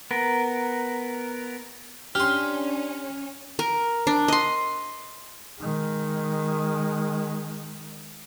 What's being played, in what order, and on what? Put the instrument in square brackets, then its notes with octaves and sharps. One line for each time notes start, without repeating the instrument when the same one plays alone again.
[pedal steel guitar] B3 A#4
[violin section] C#4 [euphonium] D4 [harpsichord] G4 C6 [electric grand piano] F6
[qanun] A#4
D4
D#5 C6
[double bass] D#3 G#3